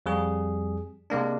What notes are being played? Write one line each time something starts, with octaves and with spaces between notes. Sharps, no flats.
F2 G3 G#4
C3 G#3 A#3 D4